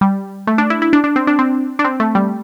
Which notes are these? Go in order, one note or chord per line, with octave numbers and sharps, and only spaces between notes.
G3
A3
D4
E4
E4
D4
D4
C4
D4
C4
D4
C4
A3
G3